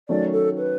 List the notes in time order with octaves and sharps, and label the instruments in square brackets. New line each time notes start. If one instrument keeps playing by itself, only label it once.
[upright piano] D#3 F#3 A3 C#4 [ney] D5
[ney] A4
B4